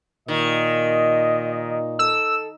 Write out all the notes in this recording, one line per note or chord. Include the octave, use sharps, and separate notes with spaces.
A#2 D#3 D#5
A4 E6